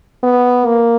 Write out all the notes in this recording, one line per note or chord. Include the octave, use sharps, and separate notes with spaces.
B3
A#3